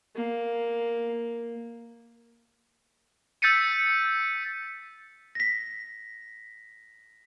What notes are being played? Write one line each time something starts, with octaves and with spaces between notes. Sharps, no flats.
A#3
E6 G6 A6 B6 C#7 D#7
A#6 B6